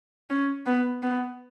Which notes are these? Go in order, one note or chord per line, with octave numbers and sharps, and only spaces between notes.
C#4
B3
B3